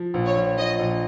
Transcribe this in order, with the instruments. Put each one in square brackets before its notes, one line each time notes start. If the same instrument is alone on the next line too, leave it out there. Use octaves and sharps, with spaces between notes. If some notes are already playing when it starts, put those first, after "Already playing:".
Already playing: [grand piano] F3
A#1
[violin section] C#5
[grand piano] A#1
[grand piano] F3 [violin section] D#5
[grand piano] A#1